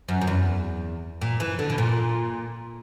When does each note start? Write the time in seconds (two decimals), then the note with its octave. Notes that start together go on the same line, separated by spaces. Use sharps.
0.08 F#2
0.21 F#2
0.27 E2
1.21 A#2
1.40 E3
1.59 D3
1.70 B2
1.78 A#2